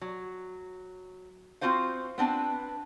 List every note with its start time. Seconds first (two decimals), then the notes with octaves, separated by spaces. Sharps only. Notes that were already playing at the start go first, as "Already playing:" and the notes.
0.01 F#3
1.61 C4 C#4 F4 F#4 C5 F5
2.18 B3 C4 D4 B4 A5